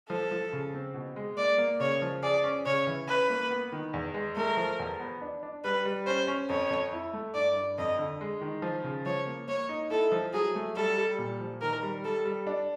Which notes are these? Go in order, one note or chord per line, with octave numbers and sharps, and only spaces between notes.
F3 A4
F3
C#3
C4
B2
G#3
A#3 D5
A#3
C#3 C#5
F3
G#4 D5
C#4
C#3 C#5
E3
C#4 B4
A#3
B3
D#3
E2
G#3
A3 A#4
F3
E2
B3
D4
D4
G3 B4
G3
C#4 C5
C#4
F2 C#5
F2
E4
A3
G2 D5
G2
F2 D#5
D3
G#3
D#3
F3
C#3
F3 C#5
A#3
A#3 C#5
D#4
E4 A4
F3
F#3 G#4
A3
G3 A4
G3
A#2
F3
D#3 A#4
G3
G3 A4
G3
D4